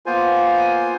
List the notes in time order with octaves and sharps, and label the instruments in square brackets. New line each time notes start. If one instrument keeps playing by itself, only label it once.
[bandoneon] A#3 B3 F4 C5 G#5